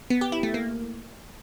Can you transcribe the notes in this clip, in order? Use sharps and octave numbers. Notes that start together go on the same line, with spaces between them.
B3
G4
E4
A3
A#3